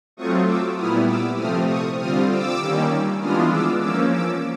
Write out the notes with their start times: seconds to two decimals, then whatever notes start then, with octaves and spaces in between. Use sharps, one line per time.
0.17 F#3 A3 C4 F4 C#6 D#6
0.46 D6 E6
0.77 A#2 G3 B3 E4 D#6 F6
1.07 D6 E6
1.38 C3 F3 A3 C4 D#6 F6
1.69 C#6 D#6
1.99 D3 G3 C4 F4 D#6 F6
2.29 D6 E6
2.59 D#3 G3 A#3 C#4
3.20 E3 G#3 B3 D4 F4 D#6 F6
3.51 D6 E6
3.82 F3 A#3 C#4 D6 E6
4.12 D6 E6